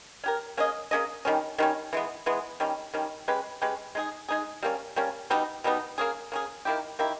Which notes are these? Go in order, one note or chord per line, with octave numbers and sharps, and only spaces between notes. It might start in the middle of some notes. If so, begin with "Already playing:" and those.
C#4 G4 A#4
A#3 C#4 G#4 D#5
A#3 C#4 G#4 D#5
D#3 G3 C#4
D#3 G3 C#4
E3 G#3 B3
E3 G#3 B3
D#3 G3 C#4
D#3 G3 C#4
G#3 C#4 G4 B4
G#3 C#4 G4 B4
G#3 D#4 G#4
G#3 D#4 G#4
G3 A#3 C#4
G3 A#3 C#4
B2 G3 B3 D#4
B2 G3 B3 D#4
A#3 C#4 G#4
A#3 C#4 G#4
D#3 A#3 E4 G4
D#3 A#3 E4 G4